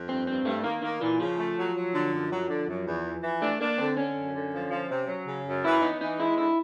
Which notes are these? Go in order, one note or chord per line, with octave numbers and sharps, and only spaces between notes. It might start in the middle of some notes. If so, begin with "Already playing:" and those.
Already playing: F2
G2 C4
G2 C4
G2 A3
D#3 A#3
D#3 A#3
A#2 E3
C#3 F3
A3
F#3
F#3
D3
F#2
F#3
D3
F#2
E2
E3
E3
A3 D4
A#3 D4
D3 C4
D3 C#4
F#2
D3
F3
F3
C3
F#3
C#3
F#2
E3 E4
B3 D#4
E3 D#4
G#3 E4
D3 E4